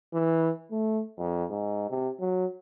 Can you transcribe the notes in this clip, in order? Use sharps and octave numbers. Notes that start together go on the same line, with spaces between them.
E3
A3
F2
G#2
C3
F#3